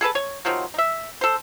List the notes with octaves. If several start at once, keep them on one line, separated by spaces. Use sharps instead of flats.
G#4 A4 B4 A5
C#5
C3 D#3 F3 F#3
D#4 E5
A4 C5